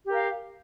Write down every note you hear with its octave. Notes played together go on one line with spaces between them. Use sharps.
G4 A#4 F5